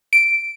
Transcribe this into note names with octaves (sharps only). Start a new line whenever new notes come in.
D7